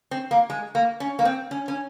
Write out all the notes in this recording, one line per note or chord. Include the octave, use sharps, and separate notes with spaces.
C4
A#3
G#3
A#3
C#4
A#3
C4
C#4
C#4